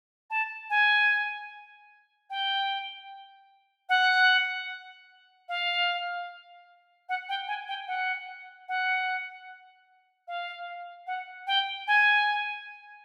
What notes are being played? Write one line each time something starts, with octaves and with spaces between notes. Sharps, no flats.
A5
G#5
G5
F#5
F5
F#5
G5
G#5
G5
F#5
F#5
F5
F#5
G5
G#5